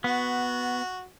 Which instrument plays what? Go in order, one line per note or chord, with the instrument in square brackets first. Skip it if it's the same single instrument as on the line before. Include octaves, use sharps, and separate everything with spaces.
[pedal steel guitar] B3 [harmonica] F#4